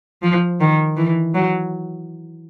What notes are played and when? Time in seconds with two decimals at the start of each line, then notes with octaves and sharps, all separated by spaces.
0.23 F3
0.60 D#3
0.96 E3
1.34 F#3